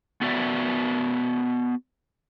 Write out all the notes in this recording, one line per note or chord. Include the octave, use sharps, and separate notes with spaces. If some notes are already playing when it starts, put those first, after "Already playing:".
B3 F#4 D5 E5